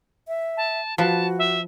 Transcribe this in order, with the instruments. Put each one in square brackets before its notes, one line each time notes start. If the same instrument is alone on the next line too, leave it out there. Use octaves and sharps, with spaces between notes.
[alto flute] E5
[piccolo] A5
[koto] F3 B4 [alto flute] F#4 [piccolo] A5
[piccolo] E5